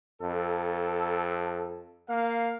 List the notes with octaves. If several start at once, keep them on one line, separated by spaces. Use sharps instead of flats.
F2 A4
A#3 F5